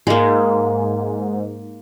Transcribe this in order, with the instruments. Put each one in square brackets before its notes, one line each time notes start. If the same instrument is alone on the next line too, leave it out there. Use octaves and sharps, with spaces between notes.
[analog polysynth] G#2 [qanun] G#3 A#3